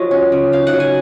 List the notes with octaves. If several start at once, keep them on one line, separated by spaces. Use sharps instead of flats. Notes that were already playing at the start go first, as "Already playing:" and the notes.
Already playing: F3 F#3 F4 C#5 D#5
C#4
C#3
D#4 F5
F#5
F#3
G#5